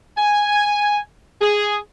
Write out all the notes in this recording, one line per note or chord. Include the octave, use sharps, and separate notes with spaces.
G#5
G#4